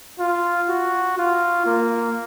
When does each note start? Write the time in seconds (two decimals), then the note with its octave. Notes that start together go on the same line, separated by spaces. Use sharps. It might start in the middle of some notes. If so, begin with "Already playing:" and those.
0.19 F4
0.69 F#4
1.18 F4
1.66 A#3